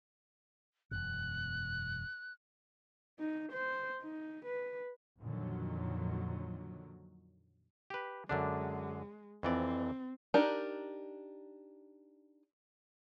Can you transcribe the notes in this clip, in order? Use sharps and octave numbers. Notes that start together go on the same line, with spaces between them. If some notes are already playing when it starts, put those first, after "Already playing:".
E1 F#2 B2 F#6
D#4
C5
D#4
B4
F2 A#2 D3 D#3 F3 F#3
G4 B4
F#2 D3 G#3 D4
F2 E3 C4 D5
D4 D#4 G4 A#4